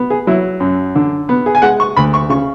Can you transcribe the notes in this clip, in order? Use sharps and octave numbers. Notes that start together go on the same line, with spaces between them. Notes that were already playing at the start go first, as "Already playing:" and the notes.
Already playing: B3
G#4
F#3 E4
F#2
D3
B3
G#4
G#5
G#3 F#5
C#6
D2 B5
C#6
C#3 C#6